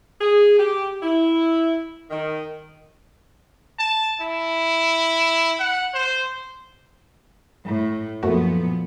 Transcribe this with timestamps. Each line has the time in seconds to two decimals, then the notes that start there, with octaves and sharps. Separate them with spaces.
0.21 G#4
0.60 G4
1.03 E4
2.11 D#3
3.79 A5
4.21 E4
5.59 F#5
5.94 C5
7.65 A2
8.23 F#2 A#2 F3 A3 B3 F#4